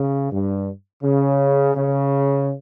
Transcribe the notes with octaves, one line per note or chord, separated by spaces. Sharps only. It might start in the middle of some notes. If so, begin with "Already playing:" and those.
Already playing: C#3
G2
C#3
C#3